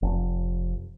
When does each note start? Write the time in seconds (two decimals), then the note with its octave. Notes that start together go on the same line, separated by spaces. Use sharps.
0.02 F1